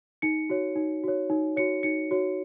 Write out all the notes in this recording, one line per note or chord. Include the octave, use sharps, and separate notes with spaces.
D#4 C#7
F#4 C#5
D#4
F#4 C#5
D#4
F#4 C#5 C#7
D#4 C#7
F#4 C#5